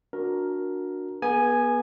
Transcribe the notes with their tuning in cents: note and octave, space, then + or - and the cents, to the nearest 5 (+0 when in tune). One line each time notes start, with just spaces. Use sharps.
D4 +0 F#4 -20 A#4 +5
B3 -30 G#4 +15 G#5 +0